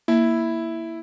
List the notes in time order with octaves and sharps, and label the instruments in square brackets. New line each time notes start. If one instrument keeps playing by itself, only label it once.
[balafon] A#3 [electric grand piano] E4